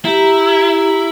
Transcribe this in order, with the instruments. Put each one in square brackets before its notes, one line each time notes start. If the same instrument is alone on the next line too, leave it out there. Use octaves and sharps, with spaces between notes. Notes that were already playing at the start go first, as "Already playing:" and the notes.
[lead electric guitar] E4 [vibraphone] G4 A#5